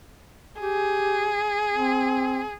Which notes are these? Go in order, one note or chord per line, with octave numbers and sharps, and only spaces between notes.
G4 G#4
C4